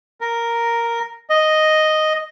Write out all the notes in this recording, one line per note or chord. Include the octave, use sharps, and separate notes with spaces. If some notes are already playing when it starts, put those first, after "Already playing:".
A#4
D#5